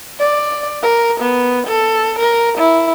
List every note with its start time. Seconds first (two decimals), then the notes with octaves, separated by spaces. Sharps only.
0.20 D5
0.83 A#4
1.20 B3
1.67 A4
2.19 A#4
2.58 E4